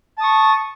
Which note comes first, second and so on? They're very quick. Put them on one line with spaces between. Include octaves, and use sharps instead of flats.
A5 D#6 C#6